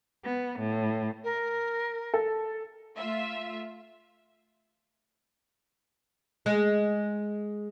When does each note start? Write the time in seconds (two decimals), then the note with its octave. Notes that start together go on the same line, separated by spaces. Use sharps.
0.25 B3
0.59 A2
1.24 A#4
2.14 A4
2.97 A3 F4 E5
6.46 G#3